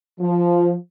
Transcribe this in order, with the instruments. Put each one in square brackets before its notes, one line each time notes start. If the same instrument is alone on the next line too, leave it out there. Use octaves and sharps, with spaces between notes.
[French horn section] F3